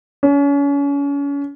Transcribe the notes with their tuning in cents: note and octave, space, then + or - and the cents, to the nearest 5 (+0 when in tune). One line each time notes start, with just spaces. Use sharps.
C#4 +35